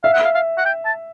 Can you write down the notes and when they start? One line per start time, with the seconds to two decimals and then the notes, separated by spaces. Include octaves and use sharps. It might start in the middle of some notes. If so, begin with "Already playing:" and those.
0.04 E5 F5
0.13 F#5
0.24 F5
0.35 F5
0.58 F#5
0.65 G5
0.86 A5